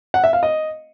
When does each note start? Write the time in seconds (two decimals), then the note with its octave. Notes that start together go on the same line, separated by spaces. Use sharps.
0.14 F#5
0.24 E5
0.33 F5
0.43 D#5